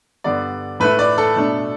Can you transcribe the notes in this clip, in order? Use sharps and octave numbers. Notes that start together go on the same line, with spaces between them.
G2 D3 B3 D5
A2 A3 E4 B4
D5
A4
B2 A3 D4